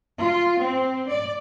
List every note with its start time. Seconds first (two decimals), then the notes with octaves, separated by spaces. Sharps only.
0.19 F4
0.61 C4
1.09 D5